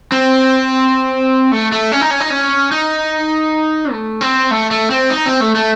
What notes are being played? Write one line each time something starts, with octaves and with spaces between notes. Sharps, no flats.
C4
A3
A3
C#4
D#4
C#4
D#4
C#4
D#4
A3
C4
A3
A3
C4
D#4
C4
A3
A3